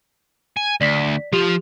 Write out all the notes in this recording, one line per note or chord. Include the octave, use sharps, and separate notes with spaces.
G#5
D2 D5 B6
F3 F4 G4 F7